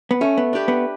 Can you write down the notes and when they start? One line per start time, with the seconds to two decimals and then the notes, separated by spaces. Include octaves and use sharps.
0.11 B3
0.21 A3 C#4
0.37 B3
0.53 D4 G4 B4
0.68 B3